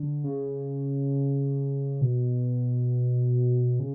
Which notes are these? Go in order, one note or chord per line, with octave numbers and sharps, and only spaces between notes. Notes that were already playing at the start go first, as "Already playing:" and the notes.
Already playing: D3
C#3
B2
C#3